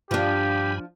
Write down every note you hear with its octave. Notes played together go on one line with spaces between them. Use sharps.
G2 F3 D4 G4 G#5 B5